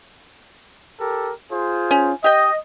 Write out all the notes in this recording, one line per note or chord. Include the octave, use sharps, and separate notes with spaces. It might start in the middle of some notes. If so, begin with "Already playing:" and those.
G4 A4 A#4
F4 G#4 C5
C#4
G4 D#5 G5